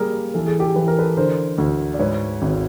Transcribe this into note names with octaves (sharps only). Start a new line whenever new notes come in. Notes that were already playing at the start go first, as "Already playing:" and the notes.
Already playing: G3 A#3 G#4 A#4
E3 A4
G#4
G4 A4
E3 B4
A#4
A4 B4
D3 A#4 C5
D2
D5
G#2 B4 C#5
G#1